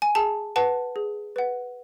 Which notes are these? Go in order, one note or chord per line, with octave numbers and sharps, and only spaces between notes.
G#5
G#4 A5
B4 F#5 A5
G#4
B4 F#5